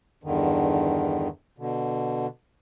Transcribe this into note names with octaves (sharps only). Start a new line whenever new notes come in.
E2 G2 D3 D#3
B2 D3